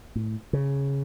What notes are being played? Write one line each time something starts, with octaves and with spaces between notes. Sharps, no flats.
A2
C#3